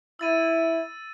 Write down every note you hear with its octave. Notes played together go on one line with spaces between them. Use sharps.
E4 E6 A6 D#7